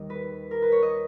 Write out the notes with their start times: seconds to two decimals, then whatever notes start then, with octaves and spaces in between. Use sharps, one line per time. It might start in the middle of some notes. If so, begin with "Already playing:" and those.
Already playing: D#2 D#3 G3 D#5
0.10 B4
0.51 A#4
0.62 B4
0.72 C#5
0.82 D#5